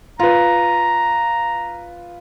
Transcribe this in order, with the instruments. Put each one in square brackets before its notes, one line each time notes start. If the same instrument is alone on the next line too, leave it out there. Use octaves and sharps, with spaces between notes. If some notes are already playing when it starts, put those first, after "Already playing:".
[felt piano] F4 B4 [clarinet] A#5